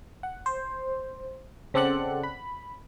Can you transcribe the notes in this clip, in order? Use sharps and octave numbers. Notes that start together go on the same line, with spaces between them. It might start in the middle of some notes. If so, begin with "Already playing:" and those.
F#5
C5
C#3 C4 A4 D5 F#5 F#6
B5